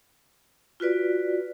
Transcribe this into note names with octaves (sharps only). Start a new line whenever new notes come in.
F4 F#4 B4 D5